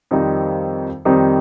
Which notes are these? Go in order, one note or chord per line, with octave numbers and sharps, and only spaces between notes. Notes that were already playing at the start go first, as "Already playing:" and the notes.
F2 D#3 G3 C4 D#4
F2 D#3 G3 C4 D#4